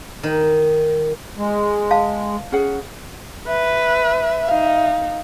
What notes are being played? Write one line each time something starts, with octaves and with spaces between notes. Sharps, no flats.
D#3
G#3
F5 A5
C#4 G#4 F#5
B4 E5
D#4 F5